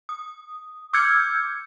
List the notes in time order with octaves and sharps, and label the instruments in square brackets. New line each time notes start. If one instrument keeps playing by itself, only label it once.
[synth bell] D#6
D6 E6 F6 G6 G#6 C#7